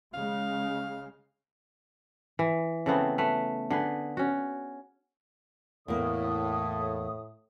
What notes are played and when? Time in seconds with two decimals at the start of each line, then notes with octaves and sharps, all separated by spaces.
0.14 C#3 G#3 F5
2.39 E3
2.86 C#3 A3 B3 C4
3.18 A3 B4
3.71 D3 G#4 B4
4.17 C#4 F#4
5.88 E2 A2 A#3 E4 D#6